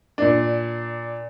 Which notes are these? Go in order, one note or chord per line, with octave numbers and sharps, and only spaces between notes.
A#2 D4